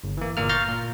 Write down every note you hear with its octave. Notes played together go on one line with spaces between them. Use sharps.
G1
E3 A#3
G1 A#2 A#3 F6
F5 A#5 C#6 F6 G6 A6
A#2